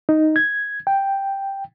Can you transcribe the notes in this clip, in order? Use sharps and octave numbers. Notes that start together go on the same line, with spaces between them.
D#4
G#6
G5